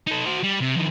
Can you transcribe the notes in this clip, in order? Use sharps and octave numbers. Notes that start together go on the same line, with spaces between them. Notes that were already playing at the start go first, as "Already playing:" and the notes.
D#4 A4
F#4 C5
G3
C3
F2 D#3